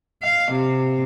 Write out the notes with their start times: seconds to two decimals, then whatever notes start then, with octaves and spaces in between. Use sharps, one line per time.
0.22 F5
0.52 C3